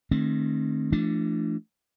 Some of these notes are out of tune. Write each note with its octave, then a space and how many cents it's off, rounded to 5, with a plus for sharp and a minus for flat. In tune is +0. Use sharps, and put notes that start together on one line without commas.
D#3 -30 A3 -10 C4 +20
E3 +45 A3 +0 D4 -5